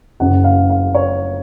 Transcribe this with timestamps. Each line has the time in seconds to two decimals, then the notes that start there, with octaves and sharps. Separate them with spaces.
0.20 F#1 F#2 C#3 F#5
0.44 F5
0.70 F5
0.95 C#5